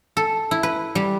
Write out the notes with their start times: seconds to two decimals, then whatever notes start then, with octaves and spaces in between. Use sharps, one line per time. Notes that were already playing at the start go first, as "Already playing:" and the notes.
0.17 A4
0.51 E4
0.63 B4
0.95 G3